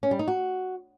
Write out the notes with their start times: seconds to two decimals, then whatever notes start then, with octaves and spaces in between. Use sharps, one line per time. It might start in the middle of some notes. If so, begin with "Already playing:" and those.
0.03 C#4
0.11 G3
0.19 D#4
0.28 F#4